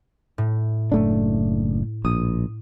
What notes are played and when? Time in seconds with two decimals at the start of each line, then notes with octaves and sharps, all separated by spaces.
0.38 A2
0.92 F#1 A3 D4
2.05 A#1 D#6